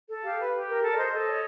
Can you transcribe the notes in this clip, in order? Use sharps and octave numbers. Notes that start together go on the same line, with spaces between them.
A4
G4 F5
B4
G4
A#4
A4
D5
C5 D#5
A4 D#5
C#5